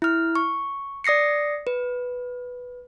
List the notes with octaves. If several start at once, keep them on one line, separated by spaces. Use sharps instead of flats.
E4 F6
C#6
D5 D#6 A#6 C7 C#7
B4